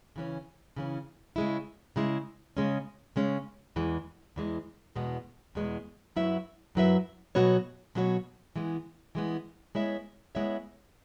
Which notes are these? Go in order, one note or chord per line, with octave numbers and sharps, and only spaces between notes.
C#3 E3 C#4
C#3 E3 C#4
C#3 G#3 E4
C#3 G#3 E4
C#3 G#3 C#4
C#3 G#3 C#4
E2 E3 G#3
E2 E3 G#3
E2 B2 G#3 B3
E2 B2 G#3 B3
F#2 F#3 E4 B4 E5
F#2 F#3 E4 B4 E5
B2 F#3 B3 F#4 C#5
B2 F#3 B3 F#4 C#5
E3 G#3 B3
E3 G#3 B3
G#3 B3 E4 C#5 E5
G#3 B3 E4 C#5 E5